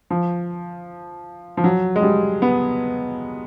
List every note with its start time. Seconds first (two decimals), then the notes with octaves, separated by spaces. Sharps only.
0.10 F3
1.57 F3
1.64 F#3
1.96 G#3
2.02 G3
2.42 B3